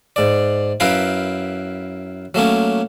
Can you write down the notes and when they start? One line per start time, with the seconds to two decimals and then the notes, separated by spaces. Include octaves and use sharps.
0.16 G#2 D5
0.80 F#2 E4 A#4 B4 F5 G5
2.34 F#3 A3 A#3 C#4